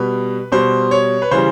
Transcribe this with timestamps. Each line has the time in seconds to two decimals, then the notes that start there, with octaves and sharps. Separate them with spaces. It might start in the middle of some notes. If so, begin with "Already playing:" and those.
Already playing: B2 G3 B4
0.52 B2 G3 C5
0.91 C#5
1.22 B4
1.31 C#3 E3 G3 C5